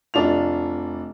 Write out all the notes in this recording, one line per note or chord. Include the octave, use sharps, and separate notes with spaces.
F1 D4 F4 F7